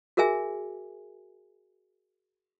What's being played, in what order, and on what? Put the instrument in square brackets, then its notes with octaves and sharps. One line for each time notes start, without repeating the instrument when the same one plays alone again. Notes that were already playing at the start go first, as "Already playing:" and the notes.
[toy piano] F#4 G#4 A#4 E5 G#5